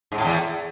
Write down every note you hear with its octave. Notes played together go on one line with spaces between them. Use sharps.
G#2
A2
E2